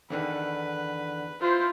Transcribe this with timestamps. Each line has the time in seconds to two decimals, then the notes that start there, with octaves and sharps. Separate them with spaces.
0.10 E2 D3 D#3 B4
1.42 E4 F4 C5